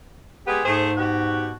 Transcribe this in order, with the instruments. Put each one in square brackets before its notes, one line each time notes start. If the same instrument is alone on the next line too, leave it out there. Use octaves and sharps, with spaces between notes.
[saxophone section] G#3 B3 G4
[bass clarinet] G#2 [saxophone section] A3 G#4 C5
[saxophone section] B2 F#4 G4